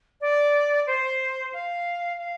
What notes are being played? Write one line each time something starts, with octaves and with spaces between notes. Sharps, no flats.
D5
C5
F5
F5